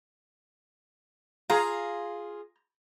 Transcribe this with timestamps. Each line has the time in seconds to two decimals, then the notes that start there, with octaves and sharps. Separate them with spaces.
1.50 F4 G#4 A#5